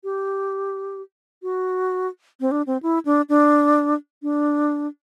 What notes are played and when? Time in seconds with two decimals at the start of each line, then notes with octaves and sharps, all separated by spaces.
0.04 G4
1.43 F#4
2.40 C4
2.51 D4
2.67 C4
2.83 E4
3.05 D4
3.29 D4
4.23 D4